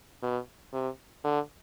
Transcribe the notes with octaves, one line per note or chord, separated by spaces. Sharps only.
B2
C3
D3